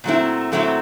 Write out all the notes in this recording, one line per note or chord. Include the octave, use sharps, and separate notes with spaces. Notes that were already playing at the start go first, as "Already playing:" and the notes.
A#2 F#3 A3 C4 E4
A#2 F#3 A3 C4 E4